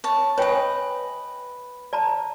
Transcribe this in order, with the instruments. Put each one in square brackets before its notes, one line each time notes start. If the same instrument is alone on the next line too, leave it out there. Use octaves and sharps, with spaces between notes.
[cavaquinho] C#5 A5
[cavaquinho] B4 D#5 [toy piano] C#5 G5 G#5
[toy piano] D5 A5 A#5